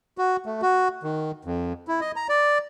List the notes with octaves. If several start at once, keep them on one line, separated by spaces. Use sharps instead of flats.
F#4
A3
F#4
D#3
F2
E4
D#5
A#5
D5